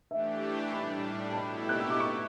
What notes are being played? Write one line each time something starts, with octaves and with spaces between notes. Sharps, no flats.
E3 A3 D4 G4 E5
A2 G3 D4 B5
A5
B2 A3 E4 G4 B5
F#6
E6
D6
C#6